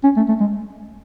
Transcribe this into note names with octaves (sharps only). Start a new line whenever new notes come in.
C#4
A3
A3
G#3